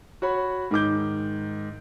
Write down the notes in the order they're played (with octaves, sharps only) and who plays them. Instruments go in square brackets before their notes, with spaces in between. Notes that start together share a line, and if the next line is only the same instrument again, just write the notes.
[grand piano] F#4 C#5 B5
G#2 D#3 D6 G6